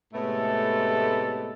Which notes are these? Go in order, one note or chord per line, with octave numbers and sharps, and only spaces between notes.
A2 C3 G#3 A3 B3 A4